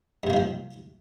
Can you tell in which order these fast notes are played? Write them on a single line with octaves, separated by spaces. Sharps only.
G2 C3 A#3 D#3 F3